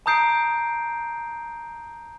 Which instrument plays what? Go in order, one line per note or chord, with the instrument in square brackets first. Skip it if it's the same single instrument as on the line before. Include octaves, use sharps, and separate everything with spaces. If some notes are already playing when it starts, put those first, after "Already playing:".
[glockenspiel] A5 A#5 D#6 G6 C7 D7